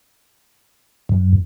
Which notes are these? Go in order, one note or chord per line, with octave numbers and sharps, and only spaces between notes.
F#2